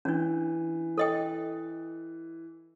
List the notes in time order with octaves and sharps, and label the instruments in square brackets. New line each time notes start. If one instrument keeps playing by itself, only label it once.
[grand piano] E3 [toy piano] C#4 D4
[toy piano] A4 D#5 G5